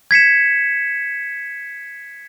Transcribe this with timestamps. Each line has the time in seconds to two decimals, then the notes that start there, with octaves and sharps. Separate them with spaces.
0.11 G#6 B6 C#7 E7